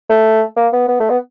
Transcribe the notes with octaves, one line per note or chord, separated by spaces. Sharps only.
A3
A#3
B3
B3
A3
B3